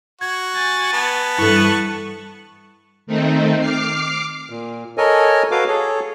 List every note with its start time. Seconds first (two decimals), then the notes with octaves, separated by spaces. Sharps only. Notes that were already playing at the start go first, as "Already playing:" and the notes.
0.21 F#4 G#6
0.55 G#5 A6
0.93 B3 A5
1.38 G2 E3 E4 A4 C#6 F#6
3.07 D#3 A3 C4 D#4
3.59 D6 F6 C7
4.50 A#2
4.98 A4 A#4 C#5 D#5 G#5
5.51 F#4 A4 B4 F5 D6
5.68 G#4 A4 C#5